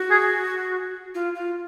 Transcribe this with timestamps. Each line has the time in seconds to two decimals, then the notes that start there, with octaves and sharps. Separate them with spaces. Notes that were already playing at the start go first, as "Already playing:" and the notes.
Already playing: F#4
0.10 G#4
1.14 F4
1.34 F4